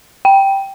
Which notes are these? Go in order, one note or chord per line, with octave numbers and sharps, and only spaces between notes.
G5